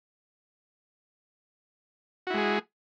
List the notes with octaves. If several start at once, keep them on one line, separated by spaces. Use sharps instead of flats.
G#3 E4 F#4 G#4